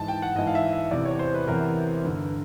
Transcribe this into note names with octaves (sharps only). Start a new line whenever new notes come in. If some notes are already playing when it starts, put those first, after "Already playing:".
Already playing: G#2 E3 A5
G5
F#5
G#2 E3 D#5
F5
E5
E5
E2 C3 E3 D5
C#5
C5
B4
E2 C3 E3 A#4
G2 D3